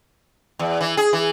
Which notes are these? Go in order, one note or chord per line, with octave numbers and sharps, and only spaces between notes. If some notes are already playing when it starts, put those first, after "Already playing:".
E2
E3
G#4
E3